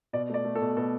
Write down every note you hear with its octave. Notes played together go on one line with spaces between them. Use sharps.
B2 D5
A3 D5
A3
A4
B2
B2 A4